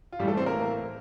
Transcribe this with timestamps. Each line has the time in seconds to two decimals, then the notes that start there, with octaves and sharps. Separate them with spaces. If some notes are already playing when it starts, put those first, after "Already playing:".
0.12 F4
0.19 A2 E3 G3 G4
0.28 A3 A4
0.37 C4 C5
0.46 A#3 A#4